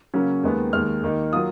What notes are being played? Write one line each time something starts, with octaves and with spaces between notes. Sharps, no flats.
C#3 F#3 A#3 C#4
D#2 D#3 G#3 B3
D#2 D#3 G#3 F6
D#2 D#3 A#3 D#4
F#3 A#3 F4 D#6